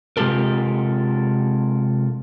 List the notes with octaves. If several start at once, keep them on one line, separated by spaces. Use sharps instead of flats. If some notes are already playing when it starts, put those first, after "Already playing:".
C3 G#3 F4 G4 A4 A#4